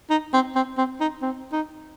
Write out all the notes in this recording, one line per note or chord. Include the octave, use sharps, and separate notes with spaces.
D#4
C4
C4
C4
D#4
C4
D#4